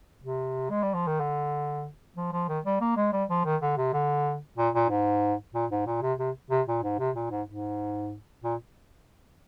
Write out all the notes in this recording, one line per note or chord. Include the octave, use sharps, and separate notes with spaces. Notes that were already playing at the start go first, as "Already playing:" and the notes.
C3
G#3
G3
F3
D#3
D3
F3
F3
D#3
G3
A#3
G#3
G3
F3
D#3
D3
C3
D3
A#2
A#2
G#2
A#2
G#2
A#2
C3
C3
C3
A#2
G#2
C3
A#2
G#2
G#2
A#2